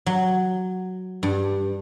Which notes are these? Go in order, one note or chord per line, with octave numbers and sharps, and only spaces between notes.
F#3
G2